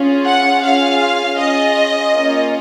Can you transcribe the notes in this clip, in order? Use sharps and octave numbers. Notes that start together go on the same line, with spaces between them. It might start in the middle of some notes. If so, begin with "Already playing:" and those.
Already playing: C#4 F4 G#4
F#5
C#4 F4 G#4 F5
C#4 F4 G#4 D#5
A#3 C#4 F4